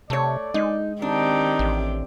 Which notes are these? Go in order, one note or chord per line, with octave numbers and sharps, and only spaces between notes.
C3 A3 C#5 D5
G#3 D#4
D#3 C4 D4 D#4 G4
A1